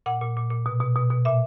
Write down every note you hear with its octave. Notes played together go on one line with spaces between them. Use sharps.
A#2 F#5
A#2
A#2
A#2
B2
B2
B2
B2
A#2 E5